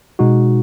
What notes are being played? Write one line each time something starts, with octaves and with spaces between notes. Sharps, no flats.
B2 G#3 D#4 F#4